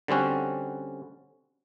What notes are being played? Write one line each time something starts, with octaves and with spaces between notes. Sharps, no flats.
D3 G3 C4 C#4 F#4